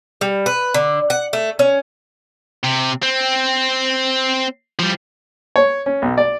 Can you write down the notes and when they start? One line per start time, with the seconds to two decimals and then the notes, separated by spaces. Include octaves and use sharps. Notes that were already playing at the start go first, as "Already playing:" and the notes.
0.21 G3
0.46 B4
0.74 D3
1.10 F#5
1.33 A3
1.59 C#4
2.63 C3
3.03 C4
4.79 F3 G3
5.56 C#5
5.86 C#4
6.02 B1
6.18 D5